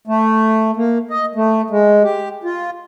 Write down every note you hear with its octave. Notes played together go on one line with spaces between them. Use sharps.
A3
A#3
D#5
A3
G#3
G4
F4